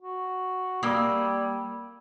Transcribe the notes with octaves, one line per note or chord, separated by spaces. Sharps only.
F#4
G3 A#3 D#6 E6 G#6